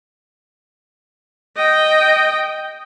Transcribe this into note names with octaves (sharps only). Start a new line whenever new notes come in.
D#5 G5